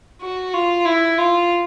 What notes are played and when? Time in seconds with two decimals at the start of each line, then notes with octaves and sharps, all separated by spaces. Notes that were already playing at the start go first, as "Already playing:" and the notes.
0.22 F#4
0.54 F4
0.85 E4
1.18 F4